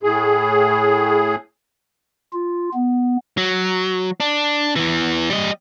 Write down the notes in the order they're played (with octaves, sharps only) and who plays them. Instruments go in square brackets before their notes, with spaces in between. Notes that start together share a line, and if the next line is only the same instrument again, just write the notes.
[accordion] A2 G#4
[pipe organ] F4
B3
[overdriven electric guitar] F#3
D4
E2 E3
G3 D#5